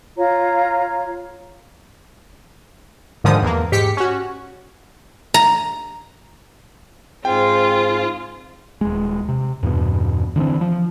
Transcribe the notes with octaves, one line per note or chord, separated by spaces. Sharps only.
F4 C#5 A#5
G#2 D3 D#3 F3 D#6
E2 A#3
G#2 G4 B6 C#7
C#4 F#4
A#5
G#2 C4 F4 G#4 G5
D#1 G#3
C3
E2 G2 B2 B3
D3 E3 B3 C4
F3